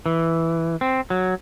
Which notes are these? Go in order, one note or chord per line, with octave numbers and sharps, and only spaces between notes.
E3
C4
F#3